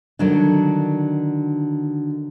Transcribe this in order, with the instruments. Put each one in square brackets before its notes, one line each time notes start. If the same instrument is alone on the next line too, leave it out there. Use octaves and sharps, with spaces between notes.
[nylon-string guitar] D3 D#3 F#3 D4